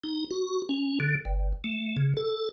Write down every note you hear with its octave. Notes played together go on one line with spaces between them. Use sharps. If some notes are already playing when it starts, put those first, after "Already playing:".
D#4
F#4
C#4
D3
G1
A3
C#3
A4